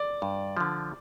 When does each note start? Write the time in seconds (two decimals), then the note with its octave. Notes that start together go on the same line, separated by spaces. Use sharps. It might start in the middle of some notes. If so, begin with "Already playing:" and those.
Already playing: D5
0.22 G2
0.57 D3 F3